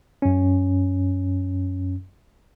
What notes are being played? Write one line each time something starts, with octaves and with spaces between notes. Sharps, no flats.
F#2 C#4